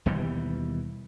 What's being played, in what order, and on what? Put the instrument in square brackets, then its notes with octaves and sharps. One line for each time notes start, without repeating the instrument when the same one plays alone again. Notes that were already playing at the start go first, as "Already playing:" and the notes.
[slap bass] D#2 B2 E3 G3